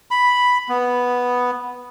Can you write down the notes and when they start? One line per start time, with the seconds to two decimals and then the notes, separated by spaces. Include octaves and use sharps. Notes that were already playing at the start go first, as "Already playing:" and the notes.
0.11 B5
0.69 B3